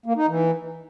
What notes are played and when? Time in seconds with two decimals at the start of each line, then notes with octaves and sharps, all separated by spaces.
0.06 A#3
0.17 D#4
0.28 E3